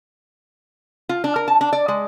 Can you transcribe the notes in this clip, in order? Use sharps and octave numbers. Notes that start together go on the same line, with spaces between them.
F4
D4
A#4
A5
D4
D5
G#3